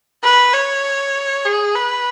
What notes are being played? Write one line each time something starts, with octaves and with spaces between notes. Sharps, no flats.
B4
C#5
G#4
B4